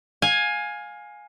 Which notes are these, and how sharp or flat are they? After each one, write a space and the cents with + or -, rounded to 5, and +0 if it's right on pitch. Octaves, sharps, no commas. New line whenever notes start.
F5 +25 G#5 +0